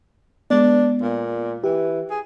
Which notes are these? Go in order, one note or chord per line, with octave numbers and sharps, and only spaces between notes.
G#3 B3 D4
A#2
E3 G4
G#4